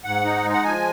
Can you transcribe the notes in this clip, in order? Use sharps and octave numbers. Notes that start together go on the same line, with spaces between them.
G#2 F#5
D#4
G#3
F#5
F3 G#5